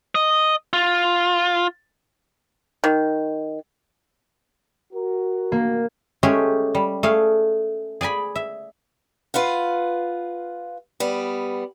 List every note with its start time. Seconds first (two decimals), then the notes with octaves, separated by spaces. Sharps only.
0.15 D#5
0.73 F4
2.84 D#3
4.93 F#4 A#4
5.52 A#3
6.23 G#3 A3 C#4 G4 G#4
6.75 G3
7.03 A3 G#4 F5
8.01 G#4 D5 G#5 B5
8.35 E5
9.34 F4 B4 F5 F#5
11.00 G3 B3